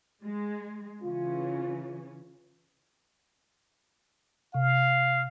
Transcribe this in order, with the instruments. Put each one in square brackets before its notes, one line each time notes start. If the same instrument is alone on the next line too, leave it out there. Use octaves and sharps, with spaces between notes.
[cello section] G#3
[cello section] C#3 E3 C#4 [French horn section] F4
[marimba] C3 [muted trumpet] F5